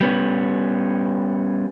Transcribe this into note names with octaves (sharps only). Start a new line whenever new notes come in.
G3 B3 C#4